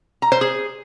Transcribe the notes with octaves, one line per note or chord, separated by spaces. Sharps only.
A#5
C5
G#4